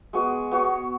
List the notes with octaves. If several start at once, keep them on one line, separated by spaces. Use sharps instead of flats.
G#3 B3 F#4
B3 F#4 C#5